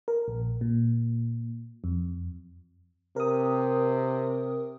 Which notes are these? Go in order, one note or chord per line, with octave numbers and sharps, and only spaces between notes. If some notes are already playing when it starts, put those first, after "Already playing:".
A#4
A#1
A#2
F2
C3 A#4 D#6